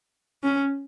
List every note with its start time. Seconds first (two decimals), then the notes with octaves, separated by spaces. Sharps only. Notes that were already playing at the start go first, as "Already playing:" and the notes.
0.43 C#4